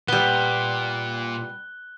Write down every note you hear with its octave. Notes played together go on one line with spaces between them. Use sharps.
A#2 G3 B3 F#6 G7